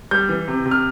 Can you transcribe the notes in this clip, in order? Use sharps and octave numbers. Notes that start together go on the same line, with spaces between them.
G3 G6
E3
C3
C3
F6